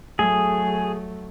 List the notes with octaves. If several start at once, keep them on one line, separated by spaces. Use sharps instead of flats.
F#3 A3 G#4